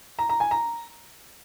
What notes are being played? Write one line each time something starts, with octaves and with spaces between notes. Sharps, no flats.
A#5
A#5
G#5
A#5